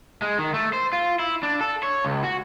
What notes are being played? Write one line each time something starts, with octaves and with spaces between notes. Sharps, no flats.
G#3
D#3
A3
C5
F4
E4
D4
A4
C#5
C#2
F#4